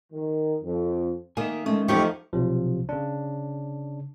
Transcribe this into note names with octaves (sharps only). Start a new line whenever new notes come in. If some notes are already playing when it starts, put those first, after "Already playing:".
D#3
F2
D#3 A#3 E5 G#5
G#3 A3 C#4
E2 D#3 F3 A3 D#4 E4 G4 C#6
B1 C3 F3
C#3 D4